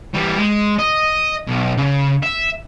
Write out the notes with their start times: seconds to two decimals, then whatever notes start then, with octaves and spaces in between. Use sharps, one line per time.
0.14 E3 G3
0.39 G#3
0.79 D#5
1.47 B1
1.77 C#3
2.23 E5